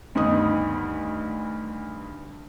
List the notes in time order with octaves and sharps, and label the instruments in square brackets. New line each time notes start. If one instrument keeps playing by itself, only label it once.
[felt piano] D2 G2 D#3 B3 D#4 D#6